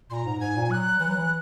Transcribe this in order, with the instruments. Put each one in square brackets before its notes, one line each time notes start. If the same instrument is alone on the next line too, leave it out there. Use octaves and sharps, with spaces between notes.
[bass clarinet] A#2 [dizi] A#5 C6
[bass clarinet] G#2
[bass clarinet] G#2 [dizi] G#5
[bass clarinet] A#2
[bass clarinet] F#3 [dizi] F#6
[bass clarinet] E3 [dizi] F#6
[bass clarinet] F#3
E3